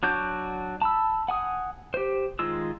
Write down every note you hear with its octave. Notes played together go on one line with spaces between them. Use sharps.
F#3 D4 F#4 G6
A5 B5 E6
F#5 G#5 D#6
G4 C5
D#3 G#3 F4 E6